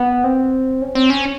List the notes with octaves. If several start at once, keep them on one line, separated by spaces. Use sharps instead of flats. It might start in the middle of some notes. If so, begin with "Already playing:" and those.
Already playing: B3
C4
C#4
C4
C#4